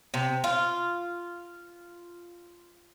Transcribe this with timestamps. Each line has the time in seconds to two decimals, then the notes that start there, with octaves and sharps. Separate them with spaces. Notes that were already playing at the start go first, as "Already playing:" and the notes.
0.14 C3
0.44 F4